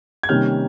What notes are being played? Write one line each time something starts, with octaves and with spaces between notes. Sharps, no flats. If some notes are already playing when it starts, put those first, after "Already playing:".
G#6
C3 D#3 G3 A#3 C#4 F6 G6